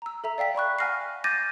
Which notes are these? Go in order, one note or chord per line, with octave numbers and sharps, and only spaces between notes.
A#5 E6
A4 E5 A#5
D5 F5 G5 B6
D5 B5 C#6 F#6
F#5 G#5 F6 A#6 C7
D6 G6 A6 A#6 D#7